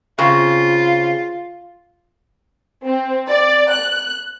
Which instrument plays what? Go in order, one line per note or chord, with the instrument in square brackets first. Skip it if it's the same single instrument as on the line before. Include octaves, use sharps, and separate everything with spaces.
[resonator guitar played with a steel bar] C#3 C4 [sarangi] F4
[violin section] C4
D5
F#6